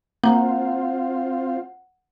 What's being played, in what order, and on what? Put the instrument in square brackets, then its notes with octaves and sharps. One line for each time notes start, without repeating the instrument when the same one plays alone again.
[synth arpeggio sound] A#3 [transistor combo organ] C4 F4 [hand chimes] F#5